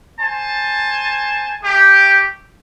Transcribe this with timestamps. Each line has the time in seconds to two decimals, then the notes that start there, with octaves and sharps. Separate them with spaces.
0.20 C5 G#5 A5
1.63 A3 G4